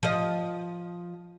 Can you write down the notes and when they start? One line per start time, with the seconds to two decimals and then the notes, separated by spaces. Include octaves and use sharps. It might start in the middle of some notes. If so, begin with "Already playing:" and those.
0.03 F3 D#5